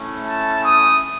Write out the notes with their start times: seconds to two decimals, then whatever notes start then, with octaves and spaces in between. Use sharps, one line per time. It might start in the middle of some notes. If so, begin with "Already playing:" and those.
Already playing: A3 C#4 E4
0.26 A5
0.64 D#6